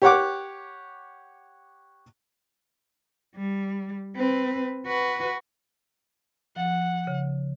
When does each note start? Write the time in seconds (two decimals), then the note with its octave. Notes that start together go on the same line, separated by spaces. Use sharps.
0.02 G4 C#5 F#5 D6
3.36 G3
4.16 C4 B4
4.86 F#4 B4
6.56 F3 F#5
7.07 C#3